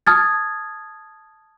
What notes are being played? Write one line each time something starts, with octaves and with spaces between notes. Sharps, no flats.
A5 D#6 F6 G#6 A6